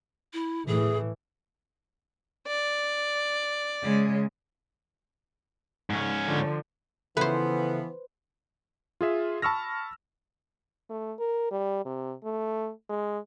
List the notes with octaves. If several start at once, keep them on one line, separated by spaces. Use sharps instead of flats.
E4
A2 E3 G#4
D5
C#3 G#3
G#2 C#4
D3 F3
C#3 E3 F3 B3 A4 B4 C5 E5
F4 G#4 E5
A5 B5 C#6 E6 F6 A#6
A3
A#4
G3
C3
A3
G#3